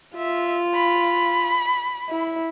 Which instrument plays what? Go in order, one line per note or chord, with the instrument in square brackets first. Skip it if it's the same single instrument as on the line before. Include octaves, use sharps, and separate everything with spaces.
[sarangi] F4 [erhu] E5
[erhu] B5
[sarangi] E4